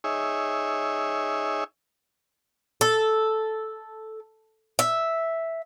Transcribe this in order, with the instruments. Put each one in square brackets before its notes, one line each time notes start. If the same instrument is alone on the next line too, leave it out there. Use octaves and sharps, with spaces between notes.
[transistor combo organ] D#4 G#4 C#5 E5
[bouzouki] A4
E5